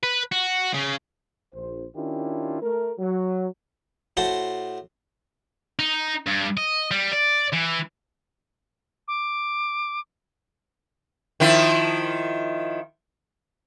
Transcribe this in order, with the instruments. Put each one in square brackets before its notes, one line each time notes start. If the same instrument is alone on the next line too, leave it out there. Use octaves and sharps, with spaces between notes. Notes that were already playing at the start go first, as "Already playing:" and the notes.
[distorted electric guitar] B4
F#4
C#3
[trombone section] A#1 C5
D#3 C#4 D4 E4 F4 G4
A3 A#4
F#3
[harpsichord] A2 F#4 C5 A5 C6
[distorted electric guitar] D#4
G2
D#5
G3
D5
E3
[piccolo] D6
[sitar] D#3 F3 E4